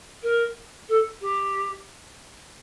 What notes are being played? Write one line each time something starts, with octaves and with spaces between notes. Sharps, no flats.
A#4
A4
G4